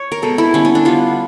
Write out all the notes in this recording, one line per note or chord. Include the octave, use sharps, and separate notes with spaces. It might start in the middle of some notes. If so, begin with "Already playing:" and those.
Already playing: C#5
A#4
B2 G#3 B3 A4
E4
D3 G3 B3 C#4
C#4
D4
D3 G3 B3 F4